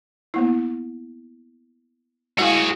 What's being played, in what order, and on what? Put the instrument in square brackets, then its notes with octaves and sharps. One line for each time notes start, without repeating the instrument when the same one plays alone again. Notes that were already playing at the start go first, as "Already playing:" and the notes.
[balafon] A#3 B3 E4
[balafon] G#3 E4 F5 [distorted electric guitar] F#4 G#4